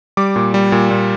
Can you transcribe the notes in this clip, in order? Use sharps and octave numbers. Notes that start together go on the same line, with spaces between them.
G3 D6
A#2
G3
A#2
A#2